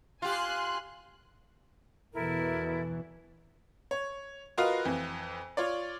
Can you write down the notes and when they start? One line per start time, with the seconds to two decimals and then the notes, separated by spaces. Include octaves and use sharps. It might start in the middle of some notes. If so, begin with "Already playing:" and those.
0.22 F4 G4 G#5 C6 F#6
2.14 E2 B2 E3 E4 A4 A#4
3.91 C#5
4.58 F4 F#4 A#4 B4 D#5 F5
4.85 F2 E3
5.57 F4 C#5 D5